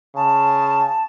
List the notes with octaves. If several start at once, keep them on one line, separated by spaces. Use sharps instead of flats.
C#3 A5